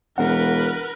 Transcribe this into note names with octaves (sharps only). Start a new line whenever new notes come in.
E1 A#4 B4 F#5